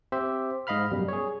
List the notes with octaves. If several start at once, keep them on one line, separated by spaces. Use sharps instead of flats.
C4 G4 C5 E5
G#2 D#5 F5 B5 F6
F#2 B2 G3
G#4 C#5